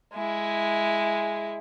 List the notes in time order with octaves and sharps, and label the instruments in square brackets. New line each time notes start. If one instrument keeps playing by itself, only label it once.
[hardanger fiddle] G#3 E4